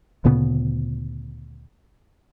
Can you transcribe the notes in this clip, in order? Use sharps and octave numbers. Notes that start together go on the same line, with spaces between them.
D2 A#2 C#3 B3